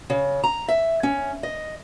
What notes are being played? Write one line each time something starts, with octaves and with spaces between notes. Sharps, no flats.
C#3
A#5
E5
C#4
D#5